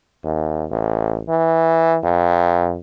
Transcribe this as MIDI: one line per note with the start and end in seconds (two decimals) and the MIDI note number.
0.24 0.66 39
0.71 1.23 33
1.29 1.97 52
2.04 2.79 41